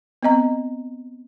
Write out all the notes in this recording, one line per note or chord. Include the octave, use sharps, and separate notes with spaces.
B3 C4 D#5 A#5